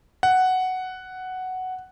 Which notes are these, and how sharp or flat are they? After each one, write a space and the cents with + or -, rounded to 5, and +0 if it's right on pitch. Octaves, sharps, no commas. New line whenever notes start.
F#5 +5